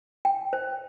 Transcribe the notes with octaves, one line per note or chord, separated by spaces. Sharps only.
G5
C5